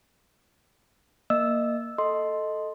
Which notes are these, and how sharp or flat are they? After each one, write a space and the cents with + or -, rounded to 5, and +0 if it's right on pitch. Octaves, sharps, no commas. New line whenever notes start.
A#3 +0 D#5 -25 E6 +0
A4 +0 D#5 +0 C6 +0